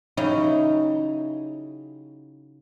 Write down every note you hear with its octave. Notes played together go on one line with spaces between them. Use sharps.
C#3 F#3 D#4 E4 G4 G#4